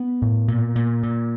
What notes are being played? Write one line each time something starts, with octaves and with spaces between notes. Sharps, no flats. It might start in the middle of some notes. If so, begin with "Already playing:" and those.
Already playing: B3
A2
A#2
A#2
A#2